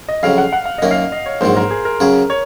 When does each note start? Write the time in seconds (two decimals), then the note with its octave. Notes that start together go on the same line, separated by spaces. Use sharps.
0.09 D#5
0.23 F2 C#3 F#3 F5
0.38 F#5
0.53 F#5
0.65 F5
0.78 F#2 D#3 A#3 C#4 D#5
0.91 F5
1.12 D#5
1.26 C#5
1.41 A#1 G#2 D#3 F#3 C5
1.56 A#4
1.71 G#4
1.85 A#4
2.00 C#3 F#3 C#4 G#4
2.30 C#5